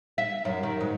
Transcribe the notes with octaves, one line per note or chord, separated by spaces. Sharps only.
E5
F#2
D#3
G#2